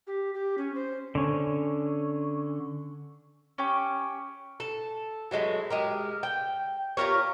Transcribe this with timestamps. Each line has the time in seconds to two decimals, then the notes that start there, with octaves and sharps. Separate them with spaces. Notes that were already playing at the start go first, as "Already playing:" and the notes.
0.07 G4
0.34 G4
0.58 C#4
0.75 C5
1.15 D3 C#4
3.58 C#4 G4
4.60 A4
5.31 E3 F#3 G#3 A3
5.70 G#3 G4 A#4
6.23 G5
6.97 F4 G4 A#4 C#5